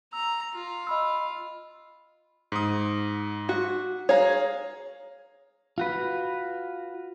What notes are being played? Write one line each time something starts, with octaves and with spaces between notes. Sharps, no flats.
A#5 E6
F4
D#5 B5 E6
G#2 D#6
F#4
G#4 C#5 F5 A#5
F4 F#4 B4